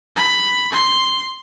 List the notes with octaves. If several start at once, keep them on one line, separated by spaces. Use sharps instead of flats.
B5
C6